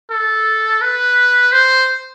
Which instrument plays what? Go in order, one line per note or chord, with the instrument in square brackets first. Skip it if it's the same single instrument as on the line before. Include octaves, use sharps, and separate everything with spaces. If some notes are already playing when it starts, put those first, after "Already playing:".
[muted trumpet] A4
B4
C5